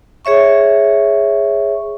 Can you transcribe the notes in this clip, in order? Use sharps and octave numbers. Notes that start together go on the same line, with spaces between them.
G#4 C#5 E5 C#6